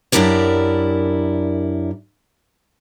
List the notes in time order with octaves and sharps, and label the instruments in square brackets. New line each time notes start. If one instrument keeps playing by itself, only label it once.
[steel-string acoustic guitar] F#2 D4 E4 G4 A#4 D5